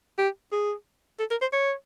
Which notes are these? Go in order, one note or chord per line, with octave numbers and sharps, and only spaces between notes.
G4
G#4
A4
A#4
C5
C#5